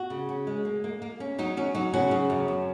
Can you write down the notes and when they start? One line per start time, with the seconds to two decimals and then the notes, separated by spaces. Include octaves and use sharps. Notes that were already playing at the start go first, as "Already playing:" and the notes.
Already playing: F#4
0.10 C#3
0.29 C#4
0.47 G#3
0.65 A#3
0.84 A#3
1.02 A#3
1.20 C#4
1.39 F#3 D#4
1.57 F#3 C#4
1.75 F#3 D#4
1.93 C#3 C#4 F#4
2.11 C#3
2.30 F#2
2.48 F#2